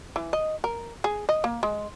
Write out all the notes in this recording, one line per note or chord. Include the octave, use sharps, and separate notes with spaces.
E3
D#5
A#4
G#4
D#5
A#3
G#3